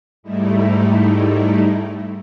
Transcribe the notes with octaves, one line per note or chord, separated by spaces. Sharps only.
G#2 G3 A3 D#4 E4